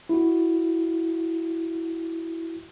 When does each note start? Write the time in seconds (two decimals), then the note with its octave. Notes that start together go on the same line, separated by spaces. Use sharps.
0.09 E4 F#4